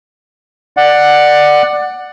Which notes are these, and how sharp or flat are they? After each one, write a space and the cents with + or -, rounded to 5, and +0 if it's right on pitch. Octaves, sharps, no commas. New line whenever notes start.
D5 +15 F#5 +0